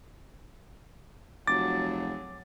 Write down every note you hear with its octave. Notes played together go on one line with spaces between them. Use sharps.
F1 F#3 F#4 G#4 D6 A6